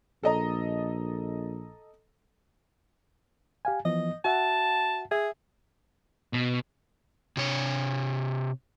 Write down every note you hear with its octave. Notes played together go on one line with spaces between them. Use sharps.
A#1 A4 D#5 A#5
G4 F5 G#5
E3 F3 B3 D#5
F#4 E5 F#5 A5
G#4 E5
B2
C3 C#5